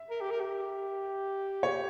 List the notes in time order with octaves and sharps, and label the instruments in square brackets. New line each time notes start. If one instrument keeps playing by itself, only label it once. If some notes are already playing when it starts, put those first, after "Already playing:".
Already playing: [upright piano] E5
[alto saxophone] A#4
G4
A#4
G4
[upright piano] C#5